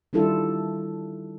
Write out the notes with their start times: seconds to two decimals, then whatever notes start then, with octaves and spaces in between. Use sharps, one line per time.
0.13 D#3 G3 D4 E4 F4 A4